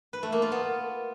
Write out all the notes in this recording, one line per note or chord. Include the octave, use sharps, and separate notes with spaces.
B4
A3
A#3
F4
B3